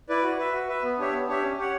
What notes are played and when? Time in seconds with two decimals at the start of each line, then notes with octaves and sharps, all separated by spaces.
0.09 E4 B4 D5
0.23 F#4
0.38 B4 E5
0.53 F#4
0.68 B4 E5
0.83 B3
0.98 D4 G4 C#5 E5
1.13 B3
1.28 D4 G4 C#5 E5
1.43 C#4
1.57 G4 C#5 F#5